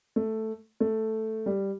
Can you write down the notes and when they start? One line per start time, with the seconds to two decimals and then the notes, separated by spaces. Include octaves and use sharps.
0.16 A3
0.80 A3
1.46 G3